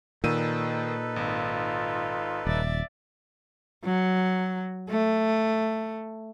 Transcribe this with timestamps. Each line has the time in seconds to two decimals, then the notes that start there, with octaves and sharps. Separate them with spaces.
0.24 A#2 D#3 D#4 A4 B4 E6 D#7
1.16 G#1 F4
2.47 D#1 D5 E5 A6
3.84 F#3
4.90 A3